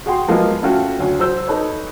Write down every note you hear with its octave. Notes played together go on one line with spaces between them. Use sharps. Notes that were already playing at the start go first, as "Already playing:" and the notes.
F#4 G#4 F#5 G5 C6
F3 F#3 G#3 A#3 B3 F4
A3 C#4 F4 F#4 A4 G5
F#1 D2 G#5
F#3 C5 E6 G6
D#4 A4 B4 C#5